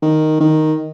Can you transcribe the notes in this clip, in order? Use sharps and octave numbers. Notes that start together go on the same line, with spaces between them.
D#3
D#3